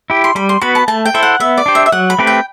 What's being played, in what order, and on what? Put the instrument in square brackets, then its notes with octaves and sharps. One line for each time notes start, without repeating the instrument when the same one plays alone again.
[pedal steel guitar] E4 G4
[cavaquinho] C6
[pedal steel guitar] G3 [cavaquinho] B5
[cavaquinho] C6
[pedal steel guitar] B3 F#4 B4 [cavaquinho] B5
[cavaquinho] A5
[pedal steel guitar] A3 [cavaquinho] A5
[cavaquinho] G5
[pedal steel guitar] E4 A4 C5 [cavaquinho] E5
[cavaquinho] F#5
[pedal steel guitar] B3 [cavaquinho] E5
[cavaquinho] D5
[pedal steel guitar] D4 G4 C5
[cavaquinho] E5
E5
[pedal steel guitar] F#3 [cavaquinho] F#5
[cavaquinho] B5
[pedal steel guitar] A3 C4 G4 B4
[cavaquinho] G5